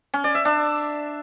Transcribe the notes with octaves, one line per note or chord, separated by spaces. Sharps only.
C#4
D5
E5
D4